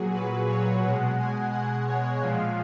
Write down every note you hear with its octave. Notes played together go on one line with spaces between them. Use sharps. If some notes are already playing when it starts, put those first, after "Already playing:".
Already playing: A#2 F#3 F#4 G#4
B4
C#5
B2 G#3 F#5
G#5
F#5
C#5
A#2 F3 G#3 F5